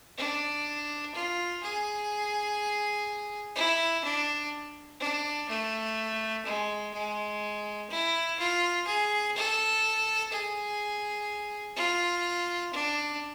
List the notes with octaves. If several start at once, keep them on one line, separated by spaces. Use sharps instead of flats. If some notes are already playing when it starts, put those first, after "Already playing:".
D4
F4
G#4
E4
D4
D4
A3
G#3
G#3
E4
F4
G#4
A4
G#4
F4
D4